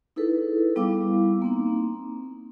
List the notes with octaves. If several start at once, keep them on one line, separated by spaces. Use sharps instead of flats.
D#4 E4 G#4 A4 B4
G3 B3 E4 F5 D6
A#3 C4 D#4